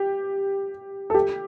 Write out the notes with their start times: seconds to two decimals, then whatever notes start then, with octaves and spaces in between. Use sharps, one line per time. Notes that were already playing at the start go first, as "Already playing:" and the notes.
Already playing: G4
1.10 A4
1.14 G4